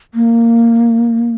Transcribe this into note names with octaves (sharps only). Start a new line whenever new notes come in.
A#3